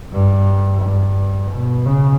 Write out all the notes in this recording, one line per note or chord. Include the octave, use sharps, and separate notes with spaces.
G2
G2
B2
C#3